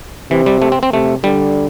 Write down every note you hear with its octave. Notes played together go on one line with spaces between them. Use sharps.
C3 E3
G3
A3
C4
C4
C3 A3
D3 G3